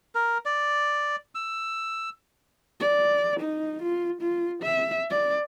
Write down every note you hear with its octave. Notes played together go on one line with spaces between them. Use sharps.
A#4
D5
E6
D5
D#4
F4
F4
E5
D5